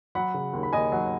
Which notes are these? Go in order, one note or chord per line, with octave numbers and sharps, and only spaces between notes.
F#3 F#5 B5
C#3
D#2
B5
D#2 D#5 G#5
F#3